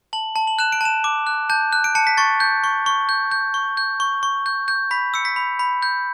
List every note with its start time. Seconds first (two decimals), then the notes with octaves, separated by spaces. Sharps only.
0.13 A5 F#7
0.36 A5
0.47 F#7
0.59 F#6 E7
0.72 D7
0.81 A5 E7
1.04 D6
1.27 F#6
1.50 A5 G6
1.72 F#6
1.84 D7
1.95 A5 C#7
2.07 B6
2.17 C#6 A6
2.40 G6
2.64 C#6
2.86 C#6
3.09 G6
3.31 G6
3.54 C#6
3.77 G6
4.00 C#6
4.23 C#6
4.46 G6
4.68 G6
4.91 B5 B6
5.14 E6 C#7
5.25 B6
5.36 B5
5.59 B5
5.82 G6